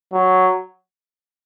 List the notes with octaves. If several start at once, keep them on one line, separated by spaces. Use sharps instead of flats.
F#3